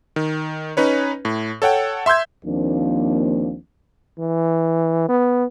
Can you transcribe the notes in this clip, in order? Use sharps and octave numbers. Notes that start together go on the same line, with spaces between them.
D#3
C#4 D#4 B4 C#5
A2
A4 C#5 F#5 G5
E5 C6 E6 G6 G#6
D#2 F3 A#3 C4 D4
E3
B3